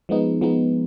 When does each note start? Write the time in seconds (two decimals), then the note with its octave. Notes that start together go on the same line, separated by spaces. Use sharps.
0.09 F3 G#3 B3 D#4
0.41 F3 G#3 B3 D#4